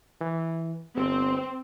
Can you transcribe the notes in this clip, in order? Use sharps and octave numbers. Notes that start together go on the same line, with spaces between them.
E3
G1 C4